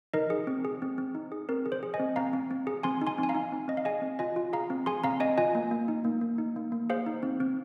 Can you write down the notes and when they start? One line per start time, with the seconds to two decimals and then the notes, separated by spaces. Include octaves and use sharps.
0.13 D#4 A#4 D#5
0.30 G#4
0.47 C4
0.65 G#4
0.82 C4
0.98 C4
1.15 D#4
1.32 G#4
1.49 C4 A#4
1.66 G#4
1.72 C5
1.83 G#4
1.94 D#5 G#5
2.00 C4
2.16 C4 F5 A#5
2.33 C4
2.51 C4
2.67 G#4
2.83 C4 G#5 C6
3.02 D#4
3.07 G#5 C6
3.18 C4
3.23 G#5
3.29 F5 A#5
3.35 D#4
3.52 C4
3.68 C4 D#5
3.77 F5
3.85 G#4 D#5 G#5
4.02 C4
4.19 F4 D#5 G#5
4.36 F4
4.53 G#4 F5 A#5
4.70 C4
4.86 G#4 G#5 C6
5.03 C4 F5 A#5
5.20 C4 D#5 G#5
5.38 F4 D#5 G#5
5.55 A#3
5.71 A#3
5.88 D#4
6.04 A#3
6.21 A#3
6.38 D#4
6.56 A#3
6.72 A#3
6.90 G#4 C5 F5
7.06 D#4
7.23 C4
7.40 C4